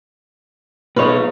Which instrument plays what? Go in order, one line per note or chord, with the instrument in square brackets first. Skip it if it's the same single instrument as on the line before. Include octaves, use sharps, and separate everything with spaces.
[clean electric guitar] B2 C#5 [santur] G#3 F4 [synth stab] B4